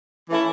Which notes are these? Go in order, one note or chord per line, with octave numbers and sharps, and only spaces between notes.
E3 A3 C#4 E4